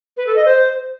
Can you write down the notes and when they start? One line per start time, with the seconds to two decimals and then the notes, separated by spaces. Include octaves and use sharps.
0.17 B4
0.26 A4
0.36 D#5
0.45 C5